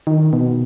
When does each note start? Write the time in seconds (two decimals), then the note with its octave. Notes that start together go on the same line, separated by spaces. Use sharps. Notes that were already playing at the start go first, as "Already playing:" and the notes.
0.07 D#3
0.33 B2